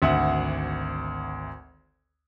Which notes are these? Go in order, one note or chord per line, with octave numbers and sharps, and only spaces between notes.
G#1 D2 E5 F#5